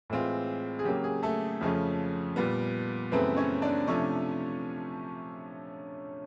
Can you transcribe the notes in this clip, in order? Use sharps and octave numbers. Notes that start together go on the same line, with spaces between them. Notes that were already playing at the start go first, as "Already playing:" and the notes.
A2 E3 G#3 C4 F4
G#4
C#3 F#3 A#3 G4
G#4
A3 A4
F2 C#3 F3 A3 C#4
A#2 G3 B3
F#2 C#3 E3 A3 B3 C4 B4
C#4 C#5
D4 D5
C3 F3 A3 C#4 D4 C#5